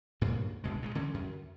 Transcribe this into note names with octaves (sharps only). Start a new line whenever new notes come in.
G2 A#2 C#3 F#3
G1 D2 B2 G#3
A#2 E3 G#3
D3 E3 C#4
F#2